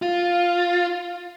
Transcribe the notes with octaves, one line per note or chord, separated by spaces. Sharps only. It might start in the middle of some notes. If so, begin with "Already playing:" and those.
F4